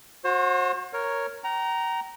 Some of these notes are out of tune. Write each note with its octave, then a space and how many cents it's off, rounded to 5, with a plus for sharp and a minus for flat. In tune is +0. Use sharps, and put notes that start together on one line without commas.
F#4 -25 C5 +35
A#4 +0 C#5 +0
G5 -40 A#5 +5